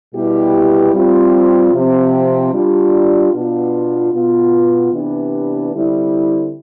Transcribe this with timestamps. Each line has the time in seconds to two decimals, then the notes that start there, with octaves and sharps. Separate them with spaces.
0.13 B2 G3 B3 E4 G4
0.93 G3 C4 F4
1.73 C3 F3 C4
2.53 G3 D4 F4
3.33 B2 B3 D4 F4
4.12 B2 B3 F4
4.92 C3 E3 B3 D4 G4
5.72 D3 G3 C4 E4